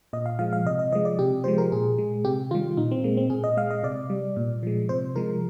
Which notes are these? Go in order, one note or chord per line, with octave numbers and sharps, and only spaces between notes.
A#2 D#5
F5
F3 G#3 F5
F5
C3 D#5
D#5
F3 G#3 D#5
D5
C3 G4
F3 G#3 C5
A#4
A#2 G#4
G#3
C3 G4
D#3 G3 F4
A#2 D#4
C4
G#3 A#3
C4
A#2 G#4
D#5
G#3 F5
D#5
C3 D5
G3
A#2
F3 G#3
C3 C5
F3 G#3 A#4